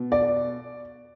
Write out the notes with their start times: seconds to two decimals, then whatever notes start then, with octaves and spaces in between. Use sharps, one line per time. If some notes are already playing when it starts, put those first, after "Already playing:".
Already playing: B2
0.12 D5